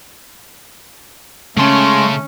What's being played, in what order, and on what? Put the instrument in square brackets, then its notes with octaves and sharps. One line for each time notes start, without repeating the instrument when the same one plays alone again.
[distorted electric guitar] C#3 [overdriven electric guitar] G#3 C6 [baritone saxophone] A3 [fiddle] C#4